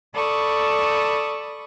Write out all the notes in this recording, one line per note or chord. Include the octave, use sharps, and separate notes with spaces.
A4 D5 B5 C#6 D#6